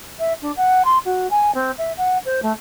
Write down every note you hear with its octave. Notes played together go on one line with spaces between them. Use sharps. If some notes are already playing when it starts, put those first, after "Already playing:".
E5
D4
F#5
C6
F#4
G#5
C4
E5
F#5
C5
A3